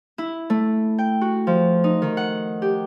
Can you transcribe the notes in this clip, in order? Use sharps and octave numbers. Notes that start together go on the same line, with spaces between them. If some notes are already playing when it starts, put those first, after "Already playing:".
E4
A3
G5
F#4
F3
D#4
D#3
F#5
G4